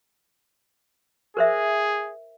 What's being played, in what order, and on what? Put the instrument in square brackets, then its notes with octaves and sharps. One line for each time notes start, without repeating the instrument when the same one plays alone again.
[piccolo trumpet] G#4 [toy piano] A#4 C5 E5